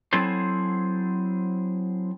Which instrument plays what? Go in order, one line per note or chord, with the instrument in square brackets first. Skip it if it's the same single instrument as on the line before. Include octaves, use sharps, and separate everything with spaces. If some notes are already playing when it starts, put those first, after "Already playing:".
[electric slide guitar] F#3 C4 E4 G#4 A4 C5